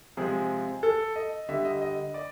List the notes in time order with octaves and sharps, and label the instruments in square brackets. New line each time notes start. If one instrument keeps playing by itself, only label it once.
[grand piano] C3 F3 G#3 G#4
A4
D#5
D3 G3 E5
D#5
D#5
D5